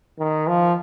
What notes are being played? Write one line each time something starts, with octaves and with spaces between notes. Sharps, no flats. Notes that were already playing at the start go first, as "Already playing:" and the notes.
D#3
F3